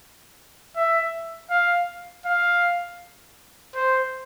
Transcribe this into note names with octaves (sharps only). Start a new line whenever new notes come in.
E5
F5
F5
C5